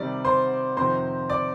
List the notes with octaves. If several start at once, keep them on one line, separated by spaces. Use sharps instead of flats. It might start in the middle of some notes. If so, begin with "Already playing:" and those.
Already playing: C3 D#3 G3 D5
C5 C6
F2 C3 D#3 C5 C6
D5 D6